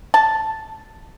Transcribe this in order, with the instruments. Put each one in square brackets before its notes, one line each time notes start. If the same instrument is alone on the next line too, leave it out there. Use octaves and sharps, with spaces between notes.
[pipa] A5